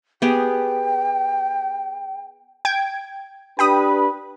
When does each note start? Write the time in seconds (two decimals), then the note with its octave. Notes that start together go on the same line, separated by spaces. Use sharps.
0.22 B3 G4 G#4 G5
2.65 G5 G#6 D7
3.59 D4 G4 B4 G5 B5 D#6